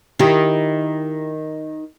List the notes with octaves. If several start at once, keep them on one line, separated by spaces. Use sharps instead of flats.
D#3 E4 G4